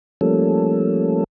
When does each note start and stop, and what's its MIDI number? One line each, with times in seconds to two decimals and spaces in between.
0.21 1.24 53
0.21 1.24 55
0.21 1.24 57
0.21 1.24 58
0.21 1.24 61
0.21 1.24 69